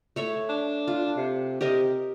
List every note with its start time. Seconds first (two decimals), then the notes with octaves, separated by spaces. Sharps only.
0.16 A3 C#5 E5
0.49 D4
0.88 F4
1.17 C3
1.61 C3 G4 A#4 D#5